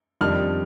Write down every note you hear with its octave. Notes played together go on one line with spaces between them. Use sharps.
F2 D#3 G3 D4 F6